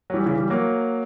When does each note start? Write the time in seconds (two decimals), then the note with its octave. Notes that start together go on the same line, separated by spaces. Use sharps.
0.10 F#3
0.14 E3 G3
0.26 C#3 E3
0.38 E3 G3
0.50 F#3 A#3